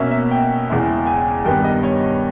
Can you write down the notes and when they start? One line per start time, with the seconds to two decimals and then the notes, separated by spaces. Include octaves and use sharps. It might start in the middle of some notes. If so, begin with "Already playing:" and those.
Already playing: B2 A#3 C#4 E5
0.11 E5
0.31 G5
0.69 E2 C#3 G#3 C#4 E4
1.07 G#5
1.45 G2 D#3 G3 B3 G5
1.64 D#5
1.83 C#5